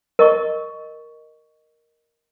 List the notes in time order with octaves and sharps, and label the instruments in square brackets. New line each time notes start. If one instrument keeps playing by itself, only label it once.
[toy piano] A#4 D#5 C#6